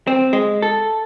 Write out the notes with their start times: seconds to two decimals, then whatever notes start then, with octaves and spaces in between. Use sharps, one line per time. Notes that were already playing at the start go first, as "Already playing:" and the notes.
0.07 C4
0.33 G#3
0.62 A4